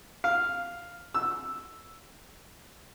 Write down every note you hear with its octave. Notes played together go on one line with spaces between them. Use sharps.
F5
E6